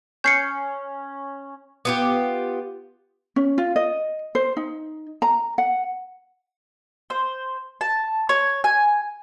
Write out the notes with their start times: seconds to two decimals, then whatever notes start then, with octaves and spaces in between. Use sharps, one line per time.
0.24 C#4 G6 C7 C#7
1.85 B3 F4 G4
3.36 C#4
3.58 F4
3.76 D#5
4.35 C5
4.57 D#4
5.22 A#5
5.58 F#5
7.10 C5
7.81 A5
8.29 C#5
8.64 G#5